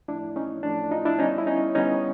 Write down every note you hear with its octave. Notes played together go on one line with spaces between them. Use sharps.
A2 F3 A3 D4 E4
C#4 D#4
A2 F3 A3 D4
D#4 F4
D4 E4
D3 G3 B3 C#4 D#4
E4
C#4 D#4
D3 G3 B3 C#4 D#4